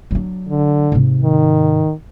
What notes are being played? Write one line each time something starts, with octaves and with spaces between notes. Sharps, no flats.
F#3 D4
D3
G#2 C3
D#3